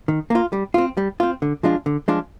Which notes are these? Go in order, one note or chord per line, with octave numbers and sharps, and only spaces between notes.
D#3
A#3 F4
G3
C4 F4
G3
C4 F4
D3
F3 G#3 D4 F4
D3
F3 G#3 D4 F4